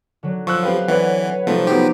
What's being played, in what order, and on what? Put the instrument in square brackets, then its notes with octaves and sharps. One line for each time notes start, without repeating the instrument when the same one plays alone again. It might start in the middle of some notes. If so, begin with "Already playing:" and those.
[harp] D3 F#3
[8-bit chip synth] F3 [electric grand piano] C#6 E6 F#6
[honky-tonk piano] C4 G4 B4 [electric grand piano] F5
[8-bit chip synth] E3 [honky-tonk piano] C4 D5 [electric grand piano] B4 C#5 F#5
[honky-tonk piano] C3 G3 A3 [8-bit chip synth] F3 [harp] D#4 C5 E5
[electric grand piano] F3 F#3 B3 [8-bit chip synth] G4